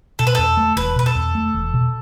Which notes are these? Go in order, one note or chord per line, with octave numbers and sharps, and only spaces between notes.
B2 A4
B4
E2 A4
A3
E1 B4
B2 B4
A4
E2
A3
E1
B2